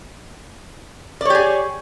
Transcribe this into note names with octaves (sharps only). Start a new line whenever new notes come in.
G4 G#4 C#5 D5